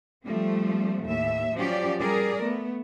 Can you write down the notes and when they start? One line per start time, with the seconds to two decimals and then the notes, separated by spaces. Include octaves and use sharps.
0.24 F3 G3 A3 C4
1.04 D#2 A2 E5
1.56 F3 F#3 C#4 G4 D5
2.00 G3 G#4 A#4 D5
2.39 A3 B3